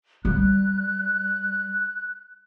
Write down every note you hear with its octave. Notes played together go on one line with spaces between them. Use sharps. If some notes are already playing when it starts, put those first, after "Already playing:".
G3 F#6